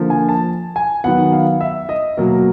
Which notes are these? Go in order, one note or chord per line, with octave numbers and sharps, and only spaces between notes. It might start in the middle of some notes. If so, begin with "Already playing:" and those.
Already playing: D3 F3 A#3
G#5
A5
G#5
D#3 F#3 B3 F#5
F5
E5
D#5
B2 F#3 A#3 A#4